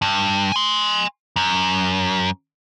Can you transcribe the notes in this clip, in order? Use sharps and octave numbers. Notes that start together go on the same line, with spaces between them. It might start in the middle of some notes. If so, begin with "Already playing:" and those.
G2
G#5 C6
F#2